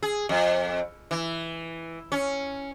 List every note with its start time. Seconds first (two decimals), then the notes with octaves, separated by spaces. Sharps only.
0.02 G#4
0.29 F2
1.11 E3
2.12 C#4